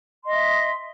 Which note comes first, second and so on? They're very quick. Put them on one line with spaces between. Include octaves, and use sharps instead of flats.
C6 D#5 E5